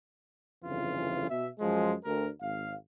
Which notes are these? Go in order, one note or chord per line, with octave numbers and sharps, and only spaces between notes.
G1 F2 C#3 E3 F4
B2 E5
F#2 F3 G#3
D2 A#4
G#1 F5